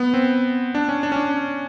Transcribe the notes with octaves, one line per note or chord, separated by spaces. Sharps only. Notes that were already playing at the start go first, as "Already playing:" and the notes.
Already playing: B3
C4
D4
C#4
D4
C#4
D4